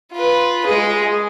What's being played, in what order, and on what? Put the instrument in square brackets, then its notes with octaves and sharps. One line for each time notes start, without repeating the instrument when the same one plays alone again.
[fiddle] F4 B4
G#3 G#4